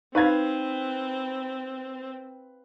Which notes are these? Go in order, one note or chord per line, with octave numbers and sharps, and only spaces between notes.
C4 D#4 B4 F5 G#6